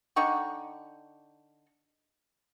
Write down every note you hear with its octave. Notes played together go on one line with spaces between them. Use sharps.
D3 D#4 G5 C#6